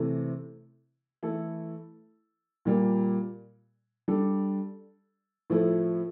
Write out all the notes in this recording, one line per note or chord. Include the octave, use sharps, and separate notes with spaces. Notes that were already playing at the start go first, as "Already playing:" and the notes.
Already playing: C3 E3 A3
E3 A3 E4 A4
A#2 G3 A#3
G3 D4 A4
A2 F3 A3 E4 A4